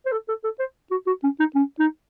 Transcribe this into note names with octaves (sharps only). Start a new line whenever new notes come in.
C5
A4
A4
A4
C5
F#4
F#4
C#4
D#4
C#4
D#4